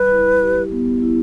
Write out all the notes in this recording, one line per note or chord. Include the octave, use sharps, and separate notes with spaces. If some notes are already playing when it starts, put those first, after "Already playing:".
Already playing: G3 B4
E4
G4
B3
E4